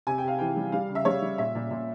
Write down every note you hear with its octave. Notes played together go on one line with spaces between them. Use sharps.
C3 G#5
G5
C3 F5
E3 G5
G3
G3 F5
C#3
E5
G3 C#5
G3
A#2 E5
A#2
A#2